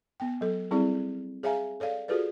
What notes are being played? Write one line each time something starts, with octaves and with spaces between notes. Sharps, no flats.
B3 G5
F#3 A4
G3 C4 E4 G#4 D5
G#4 C#5 E5 F5 G#5 A#5
A4 C#5 D5 F5
F4 F#4 G#4 A4 B4 D5